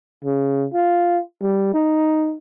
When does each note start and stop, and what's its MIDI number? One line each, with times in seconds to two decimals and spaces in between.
0.25 0.66 49
0.74 1.19 65
1.42 1.71 55
1.74 2.36 63